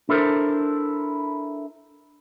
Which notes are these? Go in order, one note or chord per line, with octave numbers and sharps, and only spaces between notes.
D4 E4 A4 A#4 C5